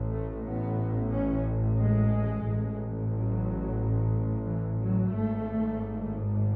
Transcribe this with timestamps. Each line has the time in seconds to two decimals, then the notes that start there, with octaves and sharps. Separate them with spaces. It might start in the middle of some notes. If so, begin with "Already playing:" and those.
Already playing: A1 A2
0.12 A3
0.45 B3
1.12 C#4
1.79 G#3
2.46 A1 A2
3.13 F#3
4.46 E3
4.80 F#3
5.13 G#1 G#2 A3